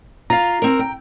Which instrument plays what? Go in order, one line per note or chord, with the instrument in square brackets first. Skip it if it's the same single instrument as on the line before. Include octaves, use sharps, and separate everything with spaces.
[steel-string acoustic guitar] F4 F5 [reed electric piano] A#5
[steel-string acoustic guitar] C4 A#4
G5